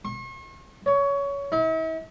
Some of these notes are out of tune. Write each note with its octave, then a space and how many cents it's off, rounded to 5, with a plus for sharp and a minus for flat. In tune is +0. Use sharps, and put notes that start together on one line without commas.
C#6 -45
C#5 +20
E4 -45